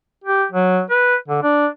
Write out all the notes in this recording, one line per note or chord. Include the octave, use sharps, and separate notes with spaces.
G4
F#3
B4
D3
D4